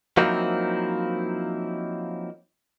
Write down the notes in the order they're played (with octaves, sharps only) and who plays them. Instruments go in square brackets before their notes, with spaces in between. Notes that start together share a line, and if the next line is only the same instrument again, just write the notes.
[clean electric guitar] F3 F#3 A#3 C4 D#4 E4